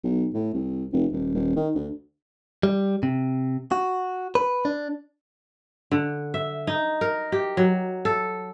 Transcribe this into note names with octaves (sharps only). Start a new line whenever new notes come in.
B1
A2
C2
F1
D#1
D#1
D#3
D2
G3
C3
F#4
B4
D4
D3
E5
D#4
A#4
G4
F#3
A4